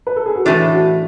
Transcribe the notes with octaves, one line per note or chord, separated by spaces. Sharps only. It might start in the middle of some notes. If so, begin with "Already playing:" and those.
B4
A4
G#4
F#4
A2 E3 A3 D4 E4
F#4